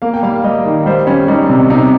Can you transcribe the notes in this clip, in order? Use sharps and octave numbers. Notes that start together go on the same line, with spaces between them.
A#3 F5
G5
G3 F5
G3 D#5
D#3
G3 C5
G3 C#4
G3 D#4
C3
C3 D#4